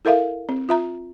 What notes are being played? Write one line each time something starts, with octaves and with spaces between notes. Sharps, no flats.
E4 A4 A#4 E5 F5
C4
F4 E5 A#5